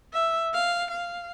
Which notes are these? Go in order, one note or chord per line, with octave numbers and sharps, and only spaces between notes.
E5
F5
F5